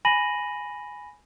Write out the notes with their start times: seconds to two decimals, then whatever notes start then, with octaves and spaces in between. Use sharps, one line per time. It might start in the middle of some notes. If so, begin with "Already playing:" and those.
0.05 G#5 B5 A#6 D#7 F#7